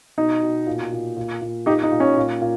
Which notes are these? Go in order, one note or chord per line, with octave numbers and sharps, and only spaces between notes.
B2 D#4
B2
A#2
A#2
A#2
A#2
A#2 D#4 G4
D#4
A#2
C#4
A#2
A#2